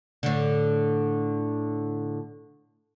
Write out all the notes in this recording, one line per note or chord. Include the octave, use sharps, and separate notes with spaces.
A2 D3